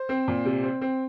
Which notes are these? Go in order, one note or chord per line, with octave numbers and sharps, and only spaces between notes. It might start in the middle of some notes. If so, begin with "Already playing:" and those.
Already playing: C5
C4
A#2
C3
C4
C4